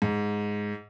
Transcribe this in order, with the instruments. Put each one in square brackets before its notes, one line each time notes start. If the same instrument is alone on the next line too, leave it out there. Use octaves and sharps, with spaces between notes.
[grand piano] G#2